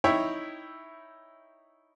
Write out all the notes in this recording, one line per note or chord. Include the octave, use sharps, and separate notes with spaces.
D#4 E4 C#5 E5 G5